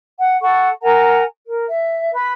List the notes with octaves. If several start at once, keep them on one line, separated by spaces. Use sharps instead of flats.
F#5
A4 F#5 C#6
A#4 F#5 G#5 A#5
A#4
E5
B4 B5